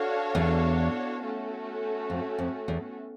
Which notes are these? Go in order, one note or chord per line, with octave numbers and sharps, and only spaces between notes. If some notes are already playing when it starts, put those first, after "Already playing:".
Already playing: D4 F#4 A4 C#5 F5
E2
A3 C#4 F#4 A4
F2
F2
E2